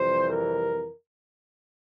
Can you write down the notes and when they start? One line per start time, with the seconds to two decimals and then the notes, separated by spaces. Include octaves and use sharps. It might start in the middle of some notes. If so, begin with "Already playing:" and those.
Already playing: F2 C3 E3 G3 C5
0.29 A#4